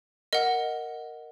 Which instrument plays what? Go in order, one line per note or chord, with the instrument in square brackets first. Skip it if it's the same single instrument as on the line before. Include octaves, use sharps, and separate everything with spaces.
[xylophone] A#4 D#5 F#5